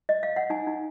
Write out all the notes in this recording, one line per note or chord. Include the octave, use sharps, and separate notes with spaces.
D#5
F5
F#5
D#4 G#5
D#4